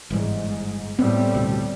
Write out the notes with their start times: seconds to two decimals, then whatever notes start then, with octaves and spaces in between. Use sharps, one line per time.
0.10 G1 G#2 E3 G3
0.99 A2 G3 B3 C4
1.35 D2 B2